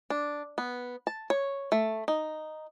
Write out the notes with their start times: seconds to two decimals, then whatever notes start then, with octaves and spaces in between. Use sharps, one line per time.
0.10 D4
0.58 B3
1.07 A5
1.30 C#5
1.72 A3
2.08 D#4